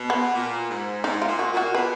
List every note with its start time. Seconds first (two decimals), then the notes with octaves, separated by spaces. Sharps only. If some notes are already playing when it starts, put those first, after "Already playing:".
Already playing: B2
0.10 B3
0.34 A#2
0.69 G#2
1.04 G#2 D#4
1.22 F4
1.28 A#2
1.39 F#4
1.52 A#2
1.57 F#4
1.75 B2 B4